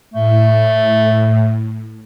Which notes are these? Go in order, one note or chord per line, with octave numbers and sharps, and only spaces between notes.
A2 A3